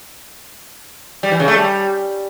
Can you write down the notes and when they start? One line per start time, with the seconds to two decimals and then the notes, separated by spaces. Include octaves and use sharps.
1.23 G3
1.31 E3
1.40 C#3
1.48 A3
1.56 G3